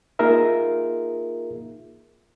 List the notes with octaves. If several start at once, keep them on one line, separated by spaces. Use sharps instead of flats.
A#3 D#4 F4 G#4 A#4 E5